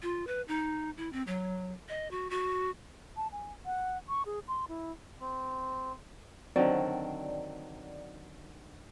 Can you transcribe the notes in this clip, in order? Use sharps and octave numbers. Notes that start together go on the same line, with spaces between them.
F4
B4
D#4
E4
C4
F#3
D#5
F#4
F#4
A5
G#5
F#5
C#6
G#4
C6
E4
C4
D3 D#3 F#3 C4 D5